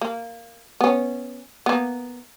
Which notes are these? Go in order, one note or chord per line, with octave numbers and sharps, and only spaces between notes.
A#3
B3 C#4
A#3 B3